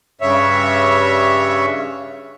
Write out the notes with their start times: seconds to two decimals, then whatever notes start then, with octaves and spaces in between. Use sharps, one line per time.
0.21 G2 C#3 C#5 E5